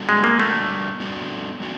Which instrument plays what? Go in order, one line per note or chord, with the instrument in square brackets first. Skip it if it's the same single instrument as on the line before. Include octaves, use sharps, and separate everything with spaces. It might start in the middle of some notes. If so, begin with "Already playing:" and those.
Already playing: [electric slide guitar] G3 B3 D4 F#4 A4
[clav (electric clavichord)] G#3
A#3
[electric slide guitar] G3 B3 D4 F#4 A4 [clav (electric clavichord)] A3
[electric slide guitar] G3 B3 D4 F#4 A4
G3 B3 D4 F#4